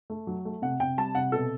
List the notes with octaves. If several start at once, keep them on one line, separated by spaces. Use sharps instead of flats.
A3
F#3
A3
C3 F#5
C3 G5
G3 A5
C3 F#5
B2 A4